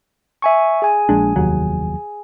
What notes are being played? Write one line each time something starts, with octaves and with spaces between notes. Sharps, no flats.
E5 G#5 C#6
G#4 G#5
A#1 G#3 D4
F1 D#2 F#3